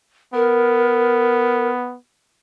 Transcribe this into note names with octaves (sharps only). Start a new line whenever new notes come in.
B3 A#4